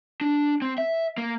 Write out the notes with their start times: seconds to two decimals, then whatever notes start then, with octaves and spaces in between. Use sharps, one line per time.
0.21 D4
0.62 C4
0.78 E5
1.18 A#3